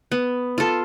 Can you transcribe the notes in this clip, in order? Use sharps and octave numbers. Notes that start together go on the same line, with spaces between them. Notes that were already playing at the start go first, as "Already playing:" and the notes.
B3
F4 A4